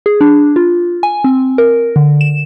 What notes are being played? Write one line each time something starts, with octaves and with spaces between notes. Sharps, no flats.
G#4
D4
F4
G#5
C4
A#4
D3
E7